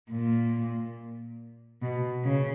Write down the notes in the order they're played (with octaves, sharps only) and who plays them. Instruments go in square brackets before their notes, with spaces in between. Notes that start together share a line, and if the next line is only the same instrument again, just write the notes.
[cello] A#2
B2
C#3